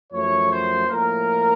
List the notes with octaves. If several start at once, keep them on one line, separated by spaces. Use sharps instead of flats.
F#2 F3 A3 C#5
C5
A2 F3 A#3 A#4